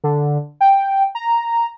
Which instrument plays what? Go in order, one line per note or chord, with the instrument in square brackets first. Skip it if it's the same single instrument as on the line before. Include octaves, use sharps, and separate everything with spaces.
[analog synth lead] D3
G5
A#5